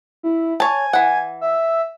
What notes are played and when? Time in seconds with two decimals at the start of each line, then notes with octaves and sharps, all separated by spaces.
0.23 E4
0.60 C#5 G#5 A5
0.93 E3 F#5
1.41 E5